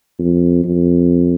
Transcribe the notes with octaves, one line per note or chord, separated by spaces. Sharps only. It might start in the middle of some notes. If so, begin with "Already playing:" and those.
F2
F2